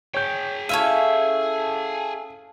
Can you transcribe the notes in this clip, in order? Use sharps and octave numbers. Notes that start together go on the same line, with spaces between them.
G#4 C#5 G5 G6
C#4 E4 A4 E5 F5 D#7